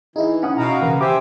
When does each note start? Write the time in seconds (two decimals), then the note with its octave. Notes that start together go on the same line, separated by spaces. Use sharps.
0.16 E3 D#4 E4 G#4
0.43 C#4 F#5 D#6
0.57 B2 F#4 F5 A#5
0.81 C#3 E3 A#3
1.01 G4 C5 E5 G#5 D6